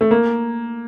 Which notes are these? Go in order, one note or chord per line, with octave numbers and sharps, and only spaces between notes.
A3
A#3